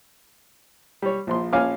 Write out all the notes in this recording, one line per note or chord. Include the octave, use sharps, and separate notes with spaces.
G3 C#5
A#1 F3 C6
A#1 C#4 F5 G#5 D6 F6